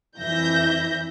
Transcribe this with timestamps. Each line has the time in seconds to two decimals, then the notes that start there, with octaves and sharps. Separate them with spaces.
0.19 F2 E3 E5 G6 A#6